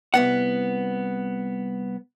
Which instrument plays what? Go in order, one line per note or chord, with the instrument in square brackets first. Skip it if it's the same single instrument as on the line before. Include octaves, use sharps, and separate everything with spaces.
[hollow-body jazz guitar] C2 B3 F#5